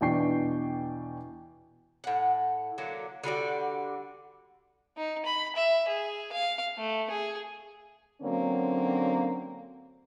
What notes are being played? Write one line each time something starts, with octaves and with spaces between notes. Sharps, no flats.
E2 B2 D4 G5 C#6 C7
A2 F#5
D3 F#3 A#3
D3 G3 F#4 D5
D#4
B5
E5
G#4
F5
A3
G#4
D3 F#3 A#3 C4 C#4